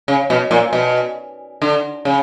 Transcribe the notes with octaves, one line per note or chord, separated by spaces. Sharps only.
C#3
B2
A#2
B2
D3
C#3